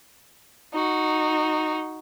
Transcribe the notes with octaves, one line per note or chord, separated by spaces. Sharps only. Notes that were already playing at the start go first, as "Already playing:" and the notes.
D#4 F#4